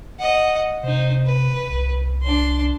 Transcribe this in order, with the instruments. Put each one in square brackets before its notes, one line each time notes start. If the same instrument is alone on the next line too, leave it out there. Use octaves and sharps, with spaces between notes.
[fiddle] D#5 F#5
[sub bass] C3 [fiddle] D#4 C5
[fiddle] B4
[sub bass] C2
[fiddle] D4 C6